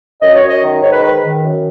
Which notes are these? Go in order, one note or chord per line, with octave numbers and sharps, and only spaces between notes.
F#2 D#5
C#5
F#2
D#5
D#3
G#2 C#5
B4
D#3 B4
D#3
F#2